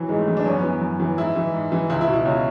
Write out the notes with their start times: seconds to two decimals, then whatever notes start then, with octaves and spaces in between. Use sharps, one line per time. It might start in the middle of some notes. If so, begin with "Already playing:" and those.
Already playing: E3 F#3
0.09 G#2 G#3
0.19 A3
0.28 E3
0.37 D4
0.45 F#2 C#4
0.53 B3
0.63 E3 C#4
0.81 F#2
1.00 E3
1.17 G#2 E4
1.36 E3
1.54 G#2
1.72 E3
1.90 C#2 E4
2.01 E4
2.08 B2
2.13 E4
2.25 C#2 C#4